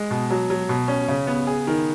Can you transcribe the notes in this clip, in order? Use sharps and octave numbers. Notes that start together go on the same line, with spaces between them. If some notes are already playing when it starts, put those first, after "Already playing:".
Already playing: G#3
B2
F#3
F#3
B2
C#4
C#3
B3
G#4
D#3